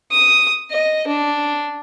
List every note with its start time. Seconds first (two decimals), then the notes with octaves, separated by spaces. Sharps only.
0.12 D#6
0.71 D#5
1.07 D4